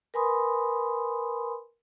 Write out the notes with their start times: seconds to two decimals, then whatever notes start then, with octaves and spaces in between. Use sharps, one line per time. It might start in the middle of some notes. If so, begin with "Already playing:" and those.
0.14 A#4 B4 G#5 B5 C6 D#6